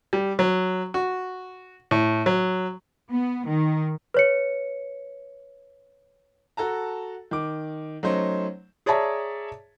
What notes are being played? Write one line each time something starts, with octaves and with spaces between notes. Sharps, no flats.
G3
F#3
F#4
A2
F#3
B3
D#3
B4 C#5 C#7
F#4 A4 A5 A#5
D#3 D6
F#3 A3 C#4 D#4 C5
G#4 C#5 D5 E5 A5 A#5